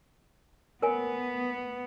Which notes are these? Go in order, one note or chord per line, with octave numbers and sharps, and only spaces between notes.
B3 A#4 C#5 G#5